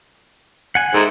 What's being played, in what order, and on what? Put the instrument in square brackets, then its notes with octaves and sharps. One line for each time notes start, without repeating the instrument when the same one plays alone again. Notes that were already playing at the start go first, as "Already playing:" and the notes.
[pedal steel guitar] F#5 G#5
[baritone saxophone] G#2 [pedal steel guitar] A4 A#4 E5